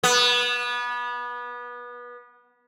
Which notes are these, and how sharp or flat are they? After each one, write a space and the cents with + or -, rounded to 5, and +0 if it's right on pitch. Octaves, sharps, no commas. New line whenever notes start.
B3 -25